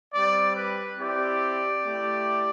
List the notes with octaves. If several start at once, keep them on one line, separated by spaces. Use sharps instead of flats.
G3 C4 G4 D5
B4
C4 E4 G4 D5
A3 E4 G4